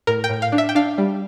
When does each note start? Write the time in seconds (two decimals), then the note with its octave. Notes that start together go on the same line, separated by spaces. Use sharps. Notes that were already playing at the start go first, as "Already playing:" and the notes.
0.07 A2 A#4
0.24 G5
0.29 A2
0.42 F5
0.52 D4
0.58 E5
0.69 G5
0.75 D4 F5
0.98 G3